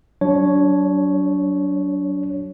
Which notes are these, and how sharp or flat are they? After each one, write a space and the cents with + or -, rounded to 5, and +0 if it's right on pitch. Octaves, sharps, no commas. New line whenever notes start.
F#3 +20 D4 -25 C#5 +0